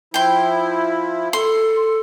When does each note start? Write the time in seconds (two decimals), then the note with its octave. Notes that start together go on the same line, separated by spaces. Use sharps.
0.14 F3 E4 G5 C6
1.33 A4 C6